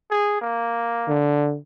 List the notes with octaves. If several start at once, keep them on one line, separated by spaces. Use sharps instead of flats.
G#4
A#3
D3